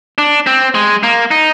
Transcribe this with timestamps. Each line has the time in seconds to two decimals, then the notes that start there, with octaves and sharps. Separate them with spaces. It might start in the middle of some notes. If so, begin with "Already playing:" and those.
0.18 D4
0.47 C4
0.75 G#3
1.03 A#3
1.31 D#4